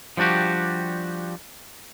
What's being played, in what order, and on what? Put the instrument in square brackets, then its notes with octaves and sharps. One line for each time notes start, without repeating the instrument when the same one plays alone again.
[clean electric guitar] F3 G3 D4 F#4 G4